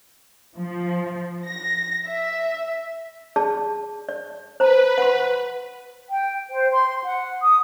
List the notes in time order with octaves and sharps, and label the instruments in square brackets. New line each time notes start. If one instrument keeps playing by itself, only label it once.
[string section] F3
A#6
E5
[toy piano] G#4 D5 A5
D5
[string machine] B4 [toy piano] C5 A#5
[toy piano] F#5 C6
[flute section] G5
C5
C6
F#5
D#6